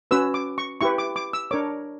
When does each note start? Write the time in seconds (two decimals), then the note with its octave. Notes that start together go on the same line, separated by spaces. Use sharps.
0.11 C#4 F#4 B4 E6
0.34 D6
0.58 C#6
0.81 E4 G4 B4 C#6
0.98 D6
1.16 D6
1.33 E6
1.51 D4 A#4 C#5 D6